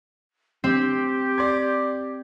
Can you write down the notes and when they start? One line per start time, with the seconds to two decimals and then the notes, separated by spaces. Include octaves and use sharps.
0.64 C4 G4
1.38 D5 C6 G#6